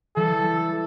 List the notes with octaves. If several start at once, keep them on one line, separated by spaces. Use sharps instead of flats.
E3 G3 A4